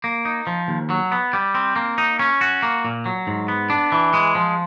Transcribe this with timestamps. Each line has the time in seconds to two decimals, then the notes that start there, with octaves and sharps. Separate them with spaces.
0.04 A#3
0.25 D#4
0.47 F3
0.68 D#2
0.90 F#3
1.12 B3
1.33 G3
1.54 C4
1.76 A#3
1.98 D#4
2.19 C#4
2.41 F#4
2.63 A#3
2.85 A#2
3.06 F#3
3.27 G#2
3.48 B3
3.70 D4
3.92 E3
4.14 G#3
4.35 F3